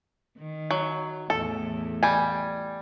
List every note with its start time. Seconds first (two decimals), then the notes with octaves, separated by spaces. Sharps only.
0.38 D#3
0.71 F#3
1.30 E2 A2 A4
2.03 G3 G#5